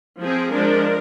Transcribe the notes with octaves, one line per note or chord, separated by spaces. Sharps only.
F3 C4 G#4
F3 G#3 D4 A#4